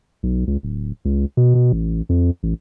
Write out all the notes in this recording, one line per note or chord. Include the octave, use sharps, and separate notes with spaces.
B1
C#2
D1
C#2
B2
B2
A1
F2
A1